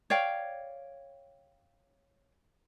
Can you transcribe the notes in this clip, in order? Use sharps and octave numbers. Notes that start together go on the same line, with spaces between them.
C#5 D5 F5 G5